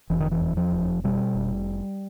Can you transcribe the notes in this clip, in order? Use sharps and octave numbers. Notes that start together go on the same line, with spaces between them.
F1 E3
D#3
E3
E2
F3
F1
B2 G3
F1